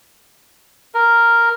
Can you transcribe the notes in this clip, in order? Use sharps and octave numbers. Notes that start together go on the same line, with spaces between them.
A#4